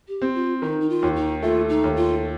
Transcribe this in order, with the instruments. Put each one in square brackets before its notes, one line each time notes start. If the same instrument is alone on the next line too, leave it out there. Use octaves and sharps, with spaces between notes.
[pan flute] G4
[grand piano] C4
[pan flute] F4
[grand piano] D#3 [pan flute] D#4
[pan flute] D#4
F4
[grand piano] D#2
[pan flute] D#4
[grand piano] A3 [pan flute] F4
[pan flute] D#4
[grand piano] D#2
[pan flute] F4